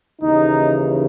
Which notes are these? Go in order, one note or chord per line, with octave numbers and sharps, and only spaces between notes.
D#2 C#3 E3 D#4